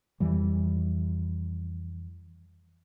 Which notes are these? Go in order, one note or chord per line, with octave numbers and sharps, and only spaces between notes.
F2 E3 G3